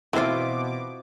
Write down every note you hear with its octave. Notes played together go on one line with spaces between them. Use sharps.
B2 E3 C4 E4 F4 C5 D6